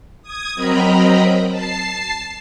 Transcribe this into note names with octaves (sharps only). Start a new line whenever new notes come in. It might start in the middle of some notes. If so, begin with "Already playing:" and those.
D#6 G#6
F#3 C4 A#4 D#5 A#5 B5
A5 C7